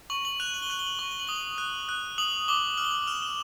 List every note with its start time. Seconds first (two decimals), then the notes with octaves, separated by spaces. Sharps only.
0.10 C#6 F#7
0.25 F#7
0.40 F#6 F7
0.54 F#7
0.62 G7
0.70 F#6 F#7
0.79 G7
0.87 F#7
0.95 G7
0.99 C#6 F#7
1.11 G7
1.20 F#7
1.27 D#6 G7
1.36 F#7
1.58 F#6
1.89 F#6
2.18 D#6 F#7
2.48 D6 G7
2.77 F6 F#7
2.84 G7
2.91 F#7
3.07 F6 F7
3.22 E7